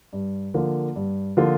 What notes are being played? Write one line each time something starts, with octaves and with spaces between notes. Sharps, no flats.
G2
D3 F3 A#3 F4
G2
D3 F3 A#3 F4